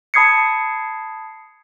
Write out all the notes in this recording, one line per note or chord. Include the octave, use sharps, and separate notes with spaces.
A5 B5 D#6 G#6 C7 C#7